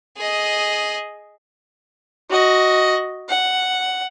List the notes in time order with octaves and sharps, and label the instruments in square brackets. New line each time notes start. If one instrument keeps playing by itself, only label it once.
[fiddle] G#4 D#5
[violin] F#4 D#5
F#5